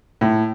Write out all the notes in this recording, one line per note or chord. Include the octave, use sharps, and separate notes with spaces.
A2